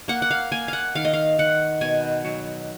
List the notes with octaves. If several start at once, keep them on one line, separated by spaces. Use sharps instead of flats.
A#3 F#5
F#5
F5
A#3 G#5
F5 F#5
D#3 F5
D#5
F5
D#3 F#5
B2 G#5
F#3